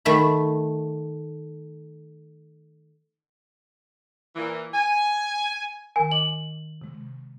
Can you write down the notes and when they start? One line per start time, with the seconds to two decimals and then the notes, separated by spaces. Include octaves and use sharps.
0.05 D#3 A3 B5
4.36 A#2 E3 A#3
4.73 G#5
5.96 D#3 A#4 G#5
6.11 D#5 D6 F#7
6.82 C3 G#3